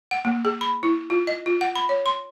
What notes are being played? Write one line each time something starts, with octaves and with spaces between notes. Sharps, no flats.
F#5
A#3
G#4
B5
E4
F4
D#5
F4
F#5
B5
C#5
C6